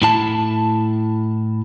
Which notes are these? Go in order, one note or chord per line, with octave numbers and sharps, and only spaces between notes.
A2 E4 A5